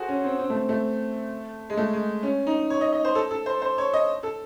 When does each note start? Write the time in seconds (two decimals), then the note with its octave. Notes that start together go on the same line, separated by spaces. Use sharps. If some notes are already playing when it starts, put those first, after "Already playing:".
Already playing: F#4 G#4 A4 C5
0.09 C#4
0.24 C4
0.39 C4
0.50 A3
0.55 C4
0.69 A3
1.70 G#3
1.77 A3
1.93 G#3
2.23 C#4
2.47 D#4
2.70 C#5
2.81 D#5
2.93 D#5
3.05 C5
3.15 A4
3.31 A4
3.46 C5
3.62 C5
3.78 C#5
3.93 D#5
4.23 A4